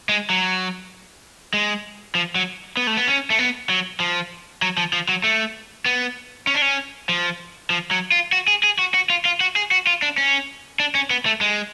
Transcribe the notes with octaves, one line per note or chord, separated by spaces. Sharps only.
G#3
F#3
G#3
F3
F#3
B3
A3
B3
C#4
A3
B3
F#3
F3
F#3
F3
F3
F#3
A3
B3
C#4
D4
C#4
F3
F3
F#3
F4
F#4
G#4
G#4
F#4
F#4
F4
F4
F#4
G#4
F#4
F4
D4
C#4
D4
C#4
B3
A3
G#3